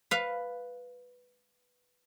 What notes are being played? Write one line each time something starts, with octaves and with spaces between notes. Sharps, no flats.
B4 F5